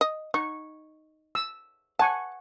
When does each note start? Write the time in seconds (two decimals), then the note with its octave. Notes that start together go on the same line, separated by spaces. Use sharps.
0.01 D#5
0.34 D#4 C#6
1.35 E6
1.99 F#5 G#5 A5 C#6